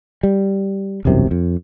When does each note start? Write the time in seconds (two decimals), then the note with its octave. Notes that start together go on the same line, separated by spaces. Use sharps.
0.23 G3
1.05 E1 C2 F#2 C3
1.31 F2